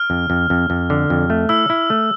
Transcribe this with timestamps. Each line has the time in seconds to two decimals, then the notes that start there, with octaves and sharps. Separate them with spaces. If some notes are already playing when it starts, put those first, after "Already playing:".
Already playing: F6
0.10 F2
0.30 F2
0.50 F2
0.70 F2
0.90 D3
1.10 F2
1.30 A3
1.49 E4 E6
1.70 E4
1.90 A3